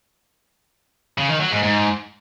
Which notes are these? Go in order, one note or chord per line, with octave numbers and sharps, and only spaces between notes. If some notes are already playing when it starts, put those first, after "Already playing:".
C#3
D#3
F#3
G#2
G#2